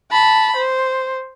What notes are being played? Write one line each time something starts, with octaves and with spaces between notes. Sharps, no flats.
A5 B5
C5